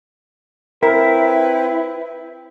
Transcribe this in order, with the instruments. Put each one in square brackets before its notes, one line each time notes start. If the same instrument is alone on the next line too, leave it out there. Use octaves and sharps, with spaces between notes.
[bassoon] C4 [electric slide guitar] E4 [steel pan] A#4 [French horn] B4